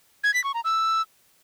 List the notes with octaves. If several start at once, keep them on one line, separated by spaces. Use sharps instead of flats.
G#6
B6
C#6
A#5
E6